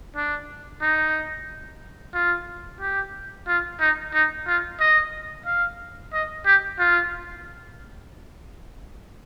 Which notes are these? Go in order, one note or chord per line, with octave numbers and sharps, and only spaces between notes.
D4
D#4
F4
G4
F4
D#4
D#4
F4
D#5
F5
D#5
G4
F4